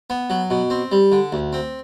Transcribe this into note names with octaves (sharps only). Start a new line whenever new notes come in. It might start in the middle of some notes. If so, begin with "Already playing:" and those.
B3
F#3
B2
C4
G3
D3
D2
C4